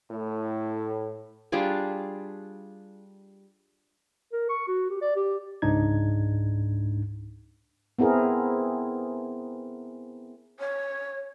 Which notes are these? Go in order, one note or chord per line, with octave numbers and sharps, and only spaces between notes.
A2
G3 D4 F4 G#4
A#4
C#6
F#4
G4
D5
G4
C#2 G#2 D4 D#4 G#6
B3 C4 E4 G#4 A#4
C#5